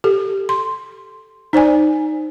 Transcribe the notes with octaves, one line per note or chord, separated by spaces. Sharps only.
G4 A4
C6
D#4 C5 D5 G#5